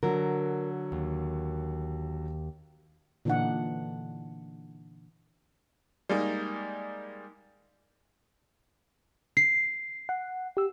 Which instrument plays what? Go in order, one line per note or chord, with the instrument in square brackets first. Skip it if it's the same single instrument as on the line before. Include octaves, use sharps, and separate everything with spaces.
[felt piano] D3 F#3 [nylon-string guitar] A#4
[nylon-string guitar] D#2
[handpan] A#2 D3 E3 D4 D#4 F#5
[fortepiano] G3 G#3 A#3 D#4
[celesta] C7
[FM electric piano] F#5
G4 E6